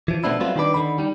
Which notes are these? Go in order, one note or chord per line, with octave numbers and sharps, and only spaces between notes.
E3 F3
B2 A3 B3 C4 D4 E4
F#3 G3 A3 B3 C4 F4
D#3 G3 D4 A4 B4 D5
D3 D#3 B5
G3 D#4